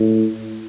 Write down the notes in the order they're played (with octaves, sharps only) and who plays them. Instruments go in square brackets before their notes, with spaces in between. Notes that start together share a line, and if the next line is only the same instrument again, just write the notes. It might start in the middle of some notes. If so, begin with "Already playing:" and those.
Already playing: [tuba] A2